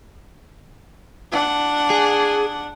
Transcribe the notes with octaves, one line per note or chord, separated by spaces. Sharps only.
D4 F#5
G#4